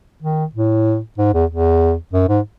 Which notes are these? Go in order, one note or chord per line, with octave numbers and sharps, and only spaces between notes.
D#3
A2
G#2
E2
E2
F#2
G#2